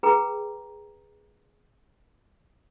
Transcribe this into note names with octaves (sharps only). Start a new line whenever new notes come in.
G#4 B4 G5 A#5